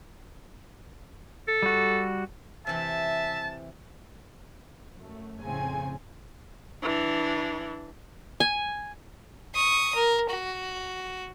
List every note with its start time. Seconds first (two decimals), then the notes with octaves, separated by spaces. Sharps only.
1.48 A4
1.62 G3 F#4
2.67 C3 E3 E5 A5
4.98 F#2 A3
5.42 F2 A2 C#3 C4 G#5
6.82 E3 D4
8.40 G#5
9.55 C#6 D#6
9.95 A#4
10.30 F#4